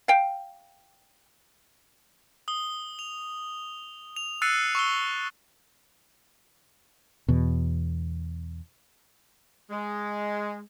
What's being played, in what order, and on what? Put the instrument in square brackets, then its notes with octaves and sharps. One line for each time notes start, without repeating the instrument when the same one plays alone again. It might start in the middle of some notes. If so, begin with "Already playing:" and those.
[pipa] F5 G5
[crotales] D#6 G7
F7
F7
E6 F#6 A6 C7 C#7 D#7
C#6 E6 G7
[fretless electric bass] E2 B2
[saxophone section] G#3